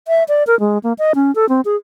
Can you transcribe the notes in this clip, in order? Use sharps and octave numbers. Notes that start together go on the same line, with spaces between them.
E5
D5
A#4
G#3
A#3
D#5
C#4
A4
C4
G#4